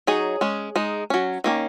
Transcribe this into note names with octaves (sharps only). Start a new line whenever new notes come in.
F#3 D#4 G#4 C#5
G#3 C#4
G#3 D#4
F#3 C#4
D#3 A#3 C#4